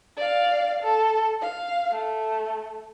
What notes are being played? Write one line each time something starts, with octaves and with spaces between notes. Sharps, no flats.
D5 F5
A4
F5
A3